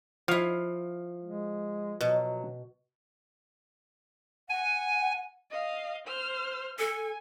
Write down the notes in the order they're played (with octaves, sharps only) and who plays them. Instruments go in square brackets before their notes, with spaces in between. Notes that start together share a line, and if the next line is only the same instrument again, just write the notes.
[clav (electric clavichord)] F3 F5 [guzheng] E4 C#5
[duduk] G#3
[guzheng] B2 [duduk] F#3
[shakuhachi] F#5 [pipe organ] G#5
[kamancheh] D#5 F5
C5 F6
[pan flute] A4 [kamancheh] G#5